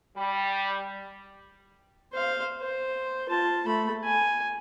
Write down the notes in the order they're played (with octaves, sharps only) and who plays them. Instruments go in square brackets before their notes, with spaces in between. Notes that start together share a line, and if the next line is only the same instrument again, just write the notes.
[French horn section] G3
[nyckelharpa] C5 F5
C5
F4 A5
A3 B5
G#5